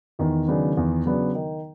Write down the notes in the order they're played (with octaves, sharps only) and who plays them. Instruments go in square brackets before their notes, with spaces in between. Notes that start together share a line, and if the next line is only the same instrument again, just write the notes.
[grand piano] E2 [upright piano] D#3
[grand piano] C#3 F#3 B3 D4
E2
C#3 F#3 B3 D4
D#3